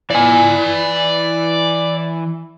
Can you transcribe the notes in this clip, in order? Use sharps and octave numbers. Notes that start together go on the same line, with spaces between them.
E3 D5 G#5